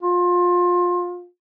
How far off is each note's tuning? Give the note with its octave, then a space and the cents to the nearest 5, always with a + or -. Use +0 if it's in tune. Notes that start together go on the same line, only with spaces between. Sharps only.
F4 +25